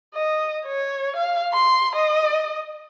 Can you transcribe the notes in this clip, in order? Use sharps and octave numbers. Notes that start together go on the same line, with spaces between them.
D#5
C#5
F5
C6
D#5